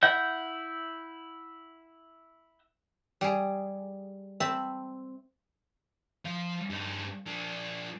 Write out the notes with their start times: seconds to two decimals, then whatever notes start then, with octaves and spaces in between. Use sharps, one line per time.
0.03 E4 E5 F#5 G6
3.21 G3 G#4
4.40 C4 E5 A5 B5
6.25 F3 F5
6.70 G2 D#4
7.26 F3 D4